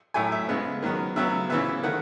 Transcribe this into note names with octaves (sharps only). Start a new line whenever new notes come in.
A2 F#3 A3 G#5
E5
C#3 G#3 B3
D#3 F#3 B3
C#3 F#3 B3 E5
C#3 E3 B3 E5
D#3 A3 F#5